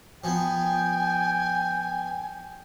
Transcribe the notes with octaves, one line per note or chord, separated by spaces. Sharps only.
F3 B3 G5 G#5